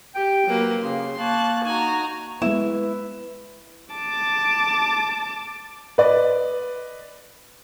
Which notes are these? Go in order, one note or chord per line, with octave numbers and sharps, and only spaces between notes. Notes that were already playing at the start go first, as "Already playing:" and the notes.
G4 G5
F#3 A#3 B4
C#3 A#3 C6
A#3 A5 C#6 F#6
D#4 F#4 G#5 A#5
G#3 A#3 B3 E4 B4
A5 D6
B4 D5 D#5